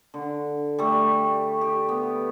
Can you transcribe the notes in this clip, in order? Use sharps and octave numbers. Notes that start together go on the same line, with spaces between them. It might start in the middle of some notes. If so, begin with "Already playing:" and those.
D3
G3 A3
G4
B3